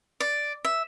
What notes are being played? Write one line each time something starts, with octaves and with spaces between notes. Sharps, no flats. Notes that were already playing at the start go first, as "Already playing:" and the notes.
D5
E5